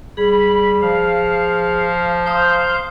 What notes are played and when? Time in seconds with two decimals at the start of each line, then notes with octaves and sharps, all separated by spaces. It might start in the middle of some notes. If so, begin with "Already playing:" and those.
0.17 G3 G#4 B5
0.82 F3 F5
2.26 C5 F5 A#5 D#6 G6